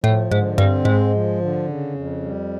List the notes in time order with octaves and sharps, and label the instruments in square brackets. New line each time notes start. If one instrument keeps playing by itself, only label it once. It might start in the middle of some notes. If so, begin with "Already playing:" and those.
[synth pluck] A2 [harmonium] F3
[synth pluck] G#2 [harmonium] D3
[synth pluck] G2 [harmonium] C4
[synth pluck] G#2 [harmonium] G#3
[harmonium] F3
D3
C#3
F2
G3